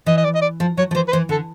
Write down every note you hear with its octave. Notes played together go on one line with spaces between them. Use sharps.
E3 D#5
D#5
D5
D#5
D5
F3
F#3 C#5
F3
E3 C5
B4
E3 C5
D3 A4